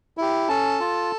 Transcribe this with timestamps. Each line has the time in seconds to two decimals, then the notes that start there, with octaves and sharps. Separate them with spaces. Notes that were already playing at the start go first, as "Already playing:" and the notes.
0.17 E4 G4
0.48 C#4 A4 A5
0.80 F4